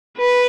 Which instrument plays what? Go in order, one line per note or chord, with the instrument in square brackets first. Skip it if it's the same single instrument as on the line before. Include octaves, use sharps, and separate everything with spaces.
[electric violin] B4